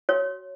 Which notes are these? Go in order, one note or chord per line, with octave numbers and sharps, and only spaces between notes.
F#4 C#5